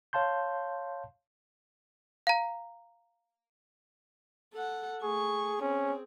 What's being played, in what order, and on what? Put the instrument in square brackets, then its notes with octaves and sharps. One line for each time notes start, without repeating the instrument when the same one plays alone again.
[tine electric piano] C#5 F5 A5 C6 G6
[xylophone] F5 A#5
[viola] A4 F#5
[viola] A3 C#6 [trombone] G#4
[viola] C4 G#4 [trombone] C#4